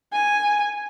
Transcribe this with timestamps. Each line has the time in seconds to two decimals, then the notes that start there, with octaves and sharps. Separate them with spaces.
0.13 G#5